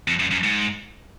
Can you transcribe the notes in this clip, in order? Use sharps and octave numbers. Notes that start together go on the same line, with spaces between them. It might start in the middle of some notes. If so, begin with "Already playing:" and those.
F2
F#2
F#2
G#2